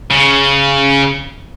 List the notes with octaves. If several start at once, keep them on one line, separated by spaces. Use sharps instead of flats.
C#3